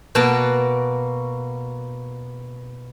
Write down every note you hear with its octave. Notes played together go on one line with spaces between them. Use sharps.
B2 A#3 F#4 A5